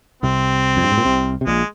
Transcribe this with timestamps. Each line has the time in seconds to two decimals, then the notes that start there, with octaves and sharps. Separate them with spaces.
0.22 C2 C3 C4
0.77 F2
0.84 G2
0.92 G#2
0.98 A#2
1.05 C2 C3
1.41 C3
1.46 A#1 A#2 G#3